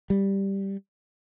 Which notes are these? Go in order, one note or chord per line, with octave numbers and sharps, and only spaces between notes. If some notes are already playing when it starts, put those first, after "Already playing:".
G3